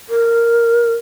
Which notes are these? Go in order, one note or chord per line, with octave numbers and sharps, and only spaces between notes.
A#4